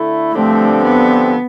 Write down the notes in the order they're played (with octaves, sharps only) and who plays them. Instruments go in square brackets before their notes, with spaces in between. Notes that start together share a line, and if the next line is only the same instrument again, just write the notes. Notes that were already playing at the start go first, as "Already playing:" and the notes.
Already playing: [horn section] D3 A3 E4
[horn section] G2 D3 F3 C4 G4 [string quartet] A3
[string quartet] B3